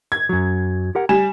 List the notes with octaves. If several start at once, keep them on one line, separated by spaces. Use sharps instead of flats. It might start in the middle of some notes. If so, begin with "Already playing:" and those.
G#6
F#2 F#3
G4 A#4 F#5
G3 G#5 E7